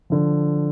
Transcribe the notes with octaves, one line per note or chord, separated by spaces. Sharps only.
D3 F3